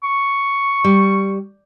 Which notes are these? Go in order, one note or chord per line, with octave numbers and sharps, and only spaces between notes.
C#6
G3